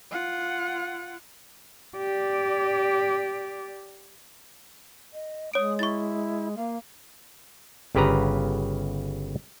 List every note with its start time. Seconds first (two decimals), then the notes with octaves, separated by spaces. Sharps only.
0.11 F4 F#5
1.97 G4 D5
5.13 D#5
5.54 G#3 C#5 D#6 D7
5.79 E4 C#6 A6
6.57 A#3 F5
7.95 G1 C#3 G4 B4 A#5